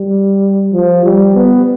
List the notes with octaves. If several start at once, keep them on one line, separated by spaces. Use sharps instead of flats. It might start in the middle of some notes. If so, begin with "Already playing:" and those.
Already playing: G3
F3
G3
B3